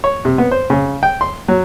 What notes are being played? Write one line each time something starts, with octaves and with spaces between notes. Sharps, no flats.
C#5
C3
B3
C5
C#3
G5
C6
F#3